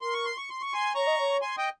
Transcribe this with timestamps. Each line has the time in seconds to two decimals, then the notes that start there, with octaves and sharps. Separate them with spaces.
0.01 A#4 C6
0.13 C#6
0.25 C6
0.37 C#6
0.50 C6
0.61 C#6
0.73 G#5 C6
0.95 C#5 A#5 C#6
1.07 D#5
1.18 C#5
1.42 G#5 C6
1.57 D#5 G5